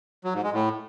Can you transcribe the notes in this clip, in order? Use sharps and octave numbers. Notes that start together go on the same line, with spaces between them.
F#3
G#2
G#3
A2